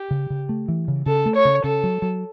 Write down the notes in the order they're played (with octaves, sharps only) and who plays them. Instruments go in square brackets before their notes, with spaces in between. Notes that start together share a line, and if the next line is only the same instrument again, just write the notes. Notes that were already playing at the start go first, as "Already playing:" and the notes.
Already playing: [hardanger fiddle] G4
[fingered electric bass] C#3
C#3
A3
E3
C#3
[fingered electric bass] C#3 [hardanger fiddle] A4
[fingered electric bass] A3
[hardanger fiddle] C#5
[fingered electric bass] C#3
[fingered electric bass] C#3 [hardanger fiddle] A4
[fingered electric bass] F#3
F#3